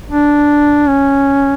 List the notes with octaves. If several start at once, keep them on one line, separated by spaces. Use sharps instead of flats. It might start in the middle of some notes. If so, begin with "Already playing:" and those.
D4
C#4